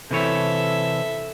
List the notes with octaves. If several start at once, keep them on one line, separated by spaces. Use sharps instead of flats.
C3 E3 A4 C#5 E5